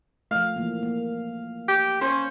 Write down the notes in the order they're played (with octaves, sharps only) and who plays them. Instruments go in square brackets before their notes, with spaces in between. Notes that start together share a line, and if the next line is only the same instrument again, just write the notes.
[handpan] F3 A3 [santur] F5
[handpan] E3 F3 A#3
A#3
[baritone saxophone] G4
[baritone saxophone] C#4 [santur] C5